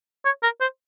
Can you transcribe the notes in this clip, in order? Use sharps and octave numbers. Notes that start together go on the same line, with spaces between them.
C#5
A#4
C5